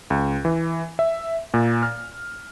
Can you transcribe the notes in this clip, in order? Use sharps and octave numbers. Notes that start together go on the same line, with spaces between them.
C#2
E3
E5
A#2
F6